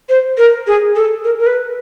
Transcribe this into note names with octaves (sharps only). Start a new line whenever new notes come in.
C5
A#4
G#4
A4
A#4
A#4
B4